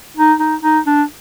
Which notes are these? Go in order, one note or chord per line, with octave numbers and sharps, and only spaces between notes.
D#4
D#4
D#4
D4